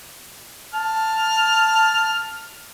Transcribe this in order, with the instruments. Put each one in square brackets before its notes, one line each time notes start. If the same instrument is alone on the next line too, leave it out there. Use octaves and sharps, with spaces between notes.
[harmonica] A5 F6